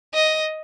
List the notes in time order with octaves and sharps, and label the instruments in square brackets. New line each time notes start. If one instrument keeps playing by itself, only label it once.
[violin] D#5